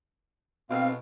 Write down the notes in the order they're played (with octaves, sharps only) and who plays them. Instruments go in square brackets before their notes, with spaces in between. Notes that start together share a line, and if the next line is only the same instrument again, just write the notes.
[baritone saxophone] B2 [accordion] C4 F5